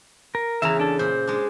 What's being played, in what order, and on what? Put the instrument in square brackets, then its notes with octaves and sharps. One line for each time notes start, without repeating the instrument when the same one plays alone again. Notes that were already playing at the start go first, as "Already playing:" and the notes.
[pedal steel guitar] A#4
[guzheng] E2 C#3 E3 [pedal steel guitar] E5 A#5
[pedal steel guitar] D4 A4
[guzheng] A#2 [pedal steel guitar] C5
[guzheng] G#3 D4